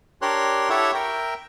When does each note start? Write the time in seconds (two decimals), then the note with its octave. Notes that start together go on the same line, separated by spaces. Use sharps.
0.22 D4 G4 A#4 C#5 C6 F#6
0.70 E4 G4 A4 C#5 E5 F#5
0.94 A#4 E5 G5